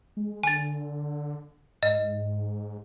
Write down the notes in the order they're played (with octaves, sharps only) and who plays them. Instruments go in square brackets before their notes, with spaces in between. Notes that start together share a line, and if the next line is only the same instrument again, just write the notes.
[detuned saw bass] G#3
[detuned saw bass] D3 [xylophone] G#5 A6
[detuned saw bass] G#2 [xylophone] D#5